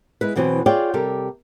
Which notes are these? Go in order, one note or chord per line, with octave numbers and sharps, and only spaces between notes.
G#3 E4 B4
E2 B2 E3 F#3 C4
F4 G#4 C#5 D5 F5 G5
C3 G3 G4 A4 A#4